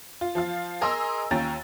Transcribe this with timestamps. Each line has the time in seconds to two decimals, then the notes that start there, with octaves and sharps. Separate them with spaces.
0.21 F4
0.35 F3 F4 F5
0.81 G#4 A#4 D#5 A#5 C6 E6
1.31 D#2 C#4 F4 G5 A#5 A6